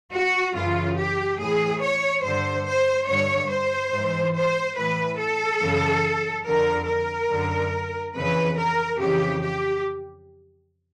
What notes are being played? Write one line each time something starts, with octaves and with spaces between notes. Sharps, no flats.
F#4
F#2 C#3 E3 F4
G4
A2 E3 G#4
C#5
G2 D3 C5
C5
G2 D3 C#5
C5
G#2
E3
C5
A2 E3 B4
A4
F#2 C#3 E3
F2 D3 A#4
A#4
F#2 D3
F2 C#3 E3 B4
A#4
F2 C#3 E3 G4
G4